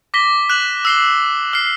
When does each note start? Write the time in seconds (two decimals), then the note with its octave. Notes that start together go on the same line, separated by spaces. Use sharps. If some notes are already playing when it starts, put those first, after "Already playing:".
0.14 D6 A#6 B6 G7
0.50 F#6 E7 F#7
0.85 E6 C7 G7
1.53 F6 C7